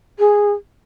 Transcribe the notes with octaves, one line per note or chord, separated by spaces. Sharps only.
G#4